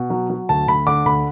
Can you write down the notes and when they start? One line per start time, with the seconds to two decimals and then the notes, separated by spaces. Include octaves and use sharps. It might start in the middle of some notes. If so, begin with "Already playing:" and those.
Already playing: B2
0.10 F#3
0.30 F#3
0.49 D2 A5
0.68 D2 B5
0.86 D3 D6
1.06 D2 B5